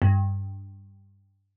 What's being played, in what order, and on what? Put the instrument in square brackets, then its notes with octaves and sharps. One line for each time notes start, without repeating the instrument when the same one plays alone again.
[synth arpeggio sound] G2